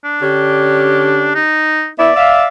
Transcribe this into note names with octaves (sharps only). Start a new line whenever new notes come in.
D4
D3 C#4 G4
D#4
B3 E4 D5 E5
E5 F5